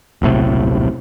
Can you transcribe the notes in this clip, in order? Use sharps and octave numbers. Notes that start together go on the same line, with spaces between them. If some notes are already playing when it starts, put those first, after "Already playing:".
D#1 B1 A2 C3